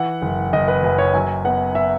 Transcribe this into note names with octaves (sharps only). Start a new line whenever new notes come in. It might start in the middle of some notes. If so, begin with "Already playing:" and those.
Already playing: E3 F#5
F#1
F#1 D#5
B4
F#2 B4
C#5
F#3 G#5
B3 F#5
E5